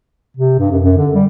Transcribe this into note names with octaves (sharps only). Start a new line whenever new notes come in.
C3
G2
F#2
F#2
D3
G3